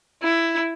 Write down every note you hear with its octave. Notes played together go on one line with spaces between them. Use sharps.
E4